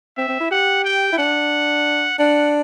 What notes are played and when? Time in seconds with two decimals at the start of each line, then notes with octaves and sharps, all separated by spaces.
0.17 C4 E5
0.28 C4
0.40 E4
0.51 G4 F#5
0.85 G5
1.12 E4
1.18 D4 F#5
2.19 D4 F#5